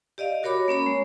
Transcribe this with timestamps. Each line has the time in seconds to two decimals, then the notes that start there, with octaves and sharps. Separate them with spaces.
0.18 G4 D5 D#5 F5
0.43 F#4 A#4 C#5 B5 D6
0.68 A#3 C#4 C#5 B5
0.86 G#3